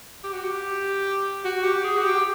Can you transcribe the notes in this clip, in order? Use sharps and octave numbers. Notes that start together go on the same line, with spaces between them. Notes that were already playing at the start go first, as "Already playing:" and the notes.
G4
F#4
G4
F#4
G4
G#4
F#4
G4